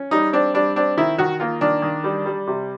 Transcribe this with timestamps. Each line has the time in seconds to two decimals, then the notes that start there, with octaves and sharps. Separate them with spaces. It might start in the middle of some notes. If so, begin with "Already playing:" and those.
Already playing: C#4
0.11 G3 D#4
0.33 C4 D4
0.54 G3 D4
0.76 C4 D4
0.97 D#3 E4
1.18 D#3 F#4
1.40 A#3 F4
1.61 D#3 D4
1.82 D#3
2.04 G3
2.26 G3
2.47 C3